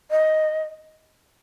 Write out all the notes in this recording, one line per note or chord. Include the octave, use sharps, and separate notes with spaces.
D#5